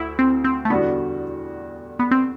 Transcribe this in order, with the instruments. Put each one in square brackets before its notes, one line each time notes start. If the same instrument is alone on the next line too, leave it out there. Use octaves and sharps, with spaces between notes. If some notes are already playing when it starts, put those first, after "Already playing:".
Already playing: [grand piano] D2 [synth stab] E4
[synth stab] C4
C4
A3
[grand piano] E2 D3 G3 D4 F#4 [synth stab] B3
[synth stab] B3
C4